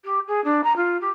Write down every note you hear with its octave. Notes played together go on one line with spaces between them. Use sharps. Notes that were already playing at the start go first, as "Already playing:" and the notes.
G4
G#4
D4
A#5
F4
G4